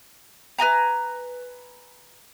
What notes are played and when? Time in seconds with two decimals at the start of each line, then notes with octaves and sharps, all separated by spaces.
0.59 B4 D#5 G#5 A#5